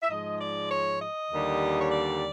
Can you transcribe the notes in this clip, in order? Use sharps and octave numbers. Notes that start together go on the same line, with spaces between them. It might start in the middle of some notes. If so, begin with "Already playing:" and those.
E5
G#2 F3 G#3 D#5
D5
C#5
D#5
D#2 D3 G3
C#5
D5